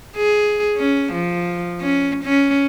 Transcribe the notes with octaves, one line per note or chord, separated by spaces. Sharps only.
G#4
C#4
F3
C#4
C#4